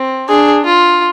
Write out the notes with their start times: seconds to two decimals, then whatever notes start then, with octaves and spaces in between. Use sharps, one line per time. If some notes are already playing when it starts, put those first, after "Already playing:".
Already playing: C4
0.28 D4 G#4
0.65 F4